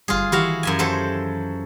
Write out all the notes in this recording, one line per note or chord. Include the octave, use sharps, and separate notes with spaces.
G1 G3 F4 G#4
D#3 E3 E4 F#4 G4 F5
F#2 E5 G#5
F#3 A4 C5